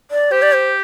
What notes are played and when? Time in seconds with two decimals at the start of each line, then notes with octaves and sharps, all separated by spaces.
0.11 D5
0.32 G4 C5
0.42 D5
0.53 C5